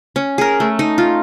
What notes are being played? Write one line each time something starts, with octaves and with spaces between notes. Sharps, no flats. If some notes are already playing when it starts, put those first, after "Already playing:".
C#4
G#4 A#4
A3
D#4
F4